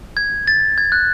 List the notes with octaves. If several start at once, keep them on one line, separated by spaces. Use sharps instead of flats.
G#6
A6
G#6
F#6